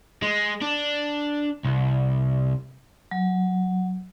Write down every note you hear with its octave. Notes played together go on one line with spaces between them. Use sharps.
G#3
D4
C2
F#3